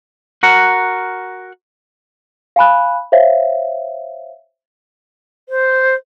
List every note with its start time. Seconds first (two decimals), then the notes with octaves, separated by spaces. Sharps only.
0.43 F#4 A#4 F#5
2.56 F5 G#5 B5 F#6
3.12 C5 C#5 E5 F5
5.49 C5